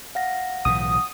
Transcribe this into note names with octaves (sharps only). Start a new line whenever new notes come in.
F5 F#5 A#6
B1 A2 E3 D#6